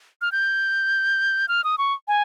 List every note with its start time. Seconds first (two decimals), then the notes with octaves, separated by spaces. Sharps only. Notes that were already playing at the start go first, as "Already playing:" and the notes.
0.22 F6
0.32 G6
1.48 F6
1.64 D#6
1.78 C#6
2.08 G#5